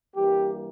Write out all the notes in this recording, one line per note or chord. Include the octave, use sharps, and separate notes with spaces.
G2 E3 G3 A#3 G4